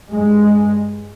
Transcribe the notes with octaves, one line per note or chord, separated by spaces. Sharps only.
G2 G#3